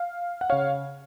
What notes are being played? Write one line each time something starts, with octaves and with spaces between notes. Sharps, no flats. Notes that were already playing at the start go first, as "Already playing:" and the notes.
Already playing: F5
F#5
C#3 C#5 F5